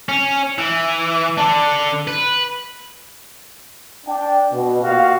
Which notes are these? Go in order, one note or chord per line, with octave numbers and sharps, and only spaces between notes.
C#4
E3
D3 D4
B4
D4 G5
B2
A#2 F#4 G4 F5